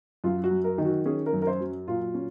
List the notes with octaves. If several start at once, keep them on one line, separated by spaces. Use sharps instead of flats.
F#2 F4
F#4
F#3
A#4
D#3
F#4
C#4 G#4
A#4
F#2
A#4
C5
F#3
A#2 F4
C#4